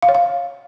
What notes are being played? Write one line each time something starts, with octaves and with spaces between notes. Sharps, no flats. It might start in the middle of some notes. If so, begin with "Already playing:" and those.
F5
C#5
F5